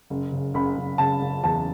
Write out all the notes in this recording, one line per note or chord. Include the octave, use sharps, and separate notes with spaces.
F#1
C#3
F#1 B5
F#1
C#3 A5
F#1
E2 A5